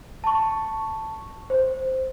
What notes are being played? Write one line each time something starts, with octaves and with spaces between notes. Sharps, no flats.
A5 C#6
C5